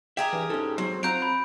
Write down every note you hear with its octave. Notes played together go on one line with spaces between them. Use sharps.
G4 G#4 A#4 E5
G2 E3
G#2 C#4 A4
F#3 C4
F3 F#3 C4 A#5 G6 D7
B5